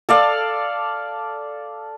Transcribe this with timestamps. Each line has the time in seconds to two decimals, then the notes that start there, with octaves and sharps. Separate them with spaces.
0.09 A4 D5 F5